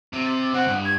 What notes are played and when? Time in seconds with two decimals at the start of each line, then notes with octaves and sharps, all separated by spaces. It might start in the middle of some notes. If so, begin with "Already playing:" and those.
0.13 C3
0.26 A6
0.53 C2 C4 F#5
0.68 G2
0.85 G#6